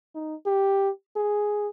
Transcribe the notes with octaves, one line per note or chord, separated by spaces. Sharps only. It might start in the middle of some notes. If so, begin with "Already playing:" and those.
D#4
G4
G#4